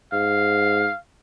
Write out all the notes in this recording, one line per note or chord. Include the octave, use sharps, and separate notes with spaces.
G#2 F5